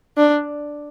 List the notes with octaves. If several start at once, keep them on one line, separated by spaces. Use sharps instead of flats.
D4